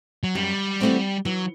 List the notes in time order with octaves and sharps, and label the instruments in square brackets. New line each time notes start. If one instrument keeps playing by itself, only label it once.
[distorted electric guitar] F#3
[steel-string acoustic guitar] F#2 [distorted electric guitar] G3
[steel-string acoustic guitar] E3 A3 C4 F#4
[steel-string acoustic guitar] E3 [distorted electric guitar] F#3